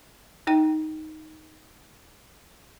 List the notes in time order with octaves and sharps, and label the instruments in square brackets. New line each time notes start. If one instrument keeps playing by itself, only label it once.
[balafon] D#4 G5